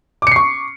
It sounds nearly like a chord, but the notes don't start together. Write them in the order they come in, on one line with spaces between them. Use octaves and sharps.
D6 C#7 C7 C#6